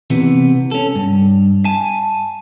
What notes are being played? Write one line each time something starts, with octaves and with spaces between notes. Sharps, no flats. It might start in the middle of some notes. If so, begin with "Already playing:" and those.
C3 E3 B3
C#4 A4
G2
G#5 A5